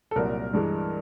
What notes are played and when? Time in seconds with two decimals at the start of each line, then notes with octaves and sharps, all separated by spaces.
0.11 A4
0.16 C2 A#2 F#3 A#4
0.53 G2 E3 G#3